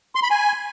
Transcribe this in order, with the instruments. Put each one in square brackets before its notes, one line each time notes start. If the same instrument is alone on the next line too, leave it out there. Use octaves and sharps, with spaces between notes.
[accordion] C6
B5
G#5